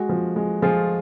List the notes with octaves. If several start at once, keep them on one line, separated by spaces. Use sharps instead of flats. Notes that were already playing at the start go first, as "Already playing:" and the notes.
Already playing: G#3 F#4
F3
G#3
F3 F4 G#4